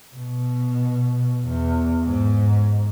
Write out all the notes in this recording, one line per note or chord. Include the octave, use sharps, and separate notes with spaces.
B2
E2
G#2